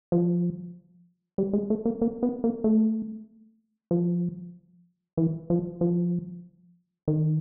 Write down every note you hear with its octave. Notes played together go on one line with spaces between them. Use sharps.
F3
G3
G#3
A3
A#3
A#3
B3
A#3
A3
F3
E3
F3
F3
D#3